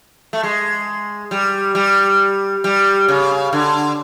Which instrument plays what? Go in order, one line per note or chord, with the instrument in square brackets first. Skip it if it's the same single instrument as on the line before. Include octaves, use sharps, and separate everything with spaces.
[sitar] A3
G#3
G3
G3
G3
C#3
D3